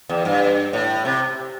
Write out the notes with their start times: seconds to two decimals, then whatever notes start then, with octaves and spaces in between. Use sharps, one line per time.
0.10 E2
0.25 G2
0.73 A2
1.05 C3